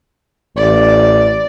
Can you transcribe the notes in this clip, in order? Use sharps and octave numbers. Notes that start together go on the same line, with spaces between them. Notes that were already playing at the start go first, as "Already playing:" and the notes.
A1 D5